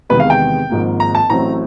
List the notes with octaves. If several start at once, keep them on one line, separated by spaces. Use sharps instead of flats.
E2 C3 D#3 G#3 B3 B4
F5
G5
G#1 G#2 F3 A#3
A#5
A5
A1 A2 F#3 A3 C4 A#5